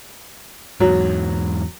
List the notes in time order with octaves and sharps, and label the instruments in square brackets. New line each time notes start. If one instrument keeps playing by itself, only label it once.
[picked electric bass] E2 G#2 [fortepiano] F#3